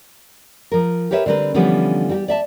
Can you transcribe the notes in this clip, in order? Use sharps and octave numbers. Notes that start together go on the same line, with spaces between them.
F3 A#4
G4 A#4 B4 C#5 D#5 E5
D3 G3 C4 A#4 B4
D3 E3 F3 G3 B3 C#4
G3 F#4 G4
D5 E5 A5